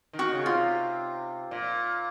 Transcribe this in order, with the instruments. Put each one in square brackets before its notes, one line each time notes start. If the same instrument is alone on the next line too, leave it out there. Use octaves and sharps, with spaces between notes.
[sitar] D#3
[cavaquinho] F#4
[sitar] C#3
[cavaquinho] F4
[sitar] C3
A#2